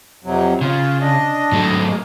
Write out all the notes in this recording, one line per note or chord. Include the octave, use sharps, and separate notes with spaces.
F2 C3 F#3
C#3 F4
D4 D#5
G#2 F#3 A3
G#3 A#3